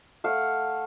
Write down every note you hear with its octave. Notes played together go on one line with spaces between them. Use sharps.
A3 F5 F#5